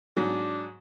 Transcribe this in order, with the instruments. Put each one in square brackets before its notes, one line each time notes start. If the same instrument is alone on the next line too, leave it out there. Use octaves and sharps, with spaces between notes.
[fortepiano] G#2 F#3 [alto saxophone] D4